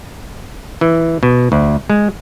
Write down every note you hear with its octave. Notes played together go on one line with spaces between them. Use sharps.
E3
B2
D2
G#3